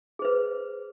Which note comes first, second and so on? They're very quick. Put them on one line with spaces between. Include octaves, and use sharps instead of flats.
G#4 C5 B4